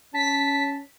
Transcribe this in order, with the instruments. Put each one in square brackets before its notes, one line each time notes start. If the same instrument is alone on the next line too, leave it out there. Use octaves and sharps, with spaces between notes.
[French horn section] C#4 [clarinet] A5 [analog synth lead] B6